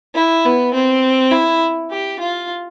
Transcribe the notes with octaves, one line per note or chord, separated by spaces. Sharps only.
E4
B3
C4
E4
G4
F4